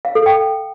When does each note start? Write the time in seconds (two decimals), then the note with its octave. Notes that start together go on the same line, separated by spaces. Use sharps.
0.05 F5
0.15 A4
0.26 G5